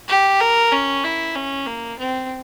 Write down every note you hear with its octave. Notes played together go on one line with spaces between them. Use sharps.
G4
A#4
C#4
E4
C#4
A#3
C4